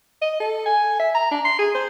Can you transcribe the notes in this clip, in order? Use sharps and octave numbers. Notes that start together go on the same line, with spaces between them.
D#5
A4
G#5
E5
A#5
D4
C6
G#4
C5